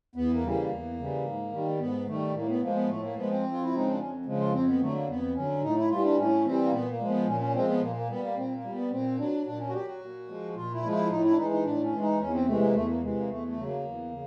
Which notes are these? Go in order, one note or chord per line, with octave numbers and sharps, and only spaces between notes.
E2 B3
A#3
C#3 E3 G3
A#3
E2
C#3 E3 G3
G#2
D#3 G3
G#2 B3
D#3 G3 A3
A2 A#3
B3
F3 G#3 A#3
B3
A2 A3
A#3
F3 G#3 B3
C4
F2
F4
E4
C#3 F3 G#3 D#4
D4
F2 C#4
C#3 F3 G#3
F4
F2 C4
B3
D3 F#3 A3
A#3
F2 B3
D3 F#3 C#4
A2 D#4
E4
E3 G3 F4
D4
A2 C#4
E3 G3 C4
A#3
A#2 B3
A#3
F3 G#3
B3
A#2 C#4
C#4
F3 G#3 C4
B3
A#2 A#3
A#3
G3 B3
A#3
A#2 C4
A#3
G3
B3
A#2 C4
F#3 D4
A#2 D4
C#4
F#4
F#3 G4
F#4
A#2
F3 G#3
A#2 F4
E4
F3 G#3
E4
A2 D#4
E4
D4
E3 G#3 D#4
D#4
A2 D4
C#4
E3 G#3
D#4
E2 C#4
C4
C3 E3 G#3 A3
A#3
E2 A3
A#3
C3 E3 G#3
A#3
E2 A3
A3
C#3 F#3
A#3
E2
C#3